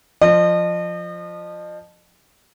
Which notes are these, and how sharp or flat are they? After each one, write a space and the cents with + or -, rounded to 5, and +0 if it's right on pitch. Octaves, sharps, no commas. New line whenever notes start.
F3 +5 D#5 -35